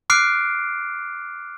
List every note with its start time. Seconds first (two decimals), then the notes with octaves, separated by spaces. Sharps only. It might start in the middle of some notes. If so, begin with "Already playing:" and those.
0.10 D6 F6 F#6 C7 D7